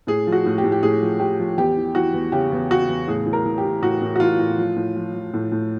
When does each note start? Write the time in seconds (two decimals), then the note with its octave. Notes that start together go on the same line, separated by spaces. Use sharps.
0.07 A2 G#4
0.27 F3
0.32 F#4
0.46 A2
0.58 G4
0.64 A2
0.72 G4
0.83 A2 G#4
1.02 F3
1.20 F3 G4
1.39 F3
1.57 E2 G4
1.77 E3
1.95 E3 F#4
2.13 E2
2.32 C#3 G4
2.52 E2
2.71 C#3 F#4
2.89 E2
3.08 A2 G#4
3.26 E3
3.33 A#4
3.45 E3
3.58 G4
3.64 E3
3.82 A2 F#4
4.02 A2
4.16 F#4
4.20 E3 F4
4.39 A2
4.58 F3
4.76 A2
4.96 F3
5.14 F3
5.33 A2
5.52 A2